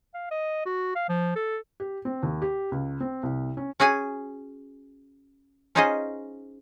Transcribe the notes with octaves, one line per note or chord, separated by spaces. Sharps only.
F5
D#5
F#4
F5
F3
A4
G4
C4
D#2
G4
C#2
C4
C2
C#4
C#4 F#4 G#4 G#5
C#4 D#4 F4 G#4 C5 D#5